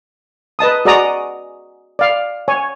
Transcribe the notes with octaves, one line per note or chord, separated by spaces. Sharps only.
B4 D#5 A5 D#6
F#4 G#4 D5 D#5 A#5 D#6
D5 F5
C#5 G#5